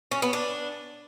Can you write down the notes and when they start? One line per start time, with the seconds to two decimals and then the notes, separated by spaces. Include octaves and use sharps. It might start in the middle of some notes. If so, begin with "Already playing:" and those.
0.11 C#4
0.22 B3
0.33 D4